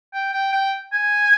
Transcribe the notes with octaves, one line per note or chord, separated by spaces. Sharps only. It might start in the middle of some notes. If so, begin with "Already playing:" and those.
G5
G5
G5
G#5